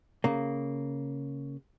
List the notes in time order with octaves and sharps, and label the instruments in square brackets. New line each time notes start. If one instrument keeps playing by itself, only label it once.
[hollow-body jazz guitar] C#3 A#3